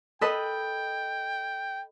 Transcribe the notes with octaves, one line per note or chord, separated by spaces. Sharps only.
A4 B4 D#5 G5